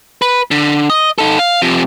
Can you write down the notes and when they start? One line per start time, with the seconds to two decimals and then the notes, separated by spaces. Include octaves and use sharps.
0.22 B4
0.51 D3
0.90 D#5
1.18 D#4 A4
1.39 F5
1.62 C3 F3